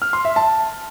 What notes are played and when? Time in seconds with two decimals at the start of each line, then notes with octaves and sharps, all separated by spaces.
0.02 F6
0.13 C6
0.25 E5
0.36 A5